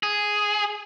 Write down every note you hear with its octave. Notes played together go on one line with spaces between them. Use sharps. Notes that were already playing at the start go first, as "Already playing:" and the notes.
G#4